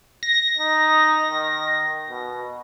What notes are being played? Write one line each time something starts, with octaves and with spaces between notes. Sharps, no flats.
A#6
D#4
D#3
B2